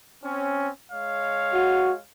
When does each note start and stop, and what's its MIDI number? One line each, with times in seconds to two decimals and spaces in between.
0.23 0.68 60
0.23 0.68 61
0.92 2.00 56
0.92 2.00 73
0.92 2.00 77
1.54 1.92 66